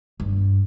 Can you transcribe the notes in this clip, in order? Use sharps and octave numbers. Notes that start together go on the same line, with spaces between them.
G2